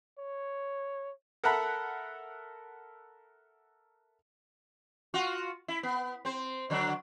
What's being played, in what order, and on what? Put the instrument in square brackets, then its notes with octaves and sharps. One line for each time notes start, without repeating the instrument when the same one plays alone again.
[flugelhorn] C#5
[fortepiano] A4 A#4 E5 F#5 A#5 B5
[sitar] F4 F#4
E4
B3
C4 C5
D3 F#3 D4